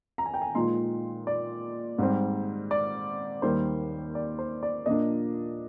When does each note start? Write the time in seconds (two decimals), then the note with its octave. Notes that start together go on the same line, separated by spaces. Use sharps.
0.18 A#5
0.26 G#5
0.34 G5
0.42 G#5
0.55 A#2 F3 G#3 D#4 C6
1.27 D5
1.98 G#2 G3 C4
2.71 D5
3.42 D#2 D#3 G3 C5
4.15 D5
4.39 C5
4.63 D5
4.86 A#2 F3 A#3 D4 D#5